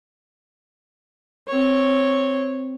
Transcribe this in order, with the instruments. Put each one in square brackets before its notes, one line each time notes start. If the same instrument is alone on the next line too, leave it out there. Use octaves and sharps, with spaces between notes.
[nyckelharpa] C4 C#5